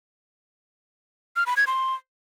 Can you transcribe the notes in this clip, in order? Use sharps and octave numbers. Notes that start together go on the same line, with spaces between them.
F6
B5
G#6
C6